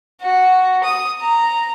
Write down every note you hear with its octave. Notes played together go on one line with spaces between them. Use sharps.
F#4
D#6
A#5